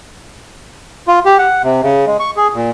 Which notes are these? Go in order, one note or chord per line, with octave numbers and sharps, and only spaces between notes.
F4
G4
F#5
C3
C#3
G#3
C#6
G#4
A#2